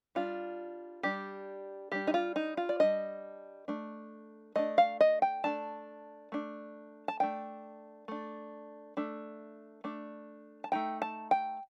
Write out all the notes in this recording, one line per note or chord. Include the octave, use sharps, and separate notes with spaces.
G3 D4 F4
G3 D4 G4
G3 D4 G4
D#4
F4
D#4
F4
D5
G3 D4 D#5
A3 D4
A3 D4 D#5
F5
D#5
G5
A3 D4 A5
A3 D4
A5
A3 D4 G5
A3 D4
A3 D4
A3 D4
A5
A3 D#4 G5
A5
G5